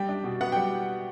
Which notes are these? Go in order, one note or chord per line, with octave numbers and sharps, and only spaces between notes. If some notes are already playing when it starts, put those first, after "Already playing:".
Already playing: G3 G5
D4
B2
B3 F#5
G5
G3